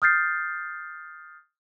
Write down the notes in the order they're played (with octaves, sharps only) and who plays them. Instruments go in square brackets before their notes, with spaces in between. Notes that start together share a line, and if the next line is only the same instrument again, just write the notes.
[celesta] D#6 F6 G6 A6 C7